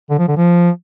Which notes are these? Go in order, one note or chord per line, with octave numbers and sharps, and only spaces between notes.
D3
F3
D3
F3